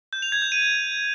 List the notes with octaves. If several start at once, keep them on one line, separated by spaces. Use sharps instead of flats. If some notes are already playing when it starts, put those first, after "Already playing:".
G6
F7
G#6
G6
D#7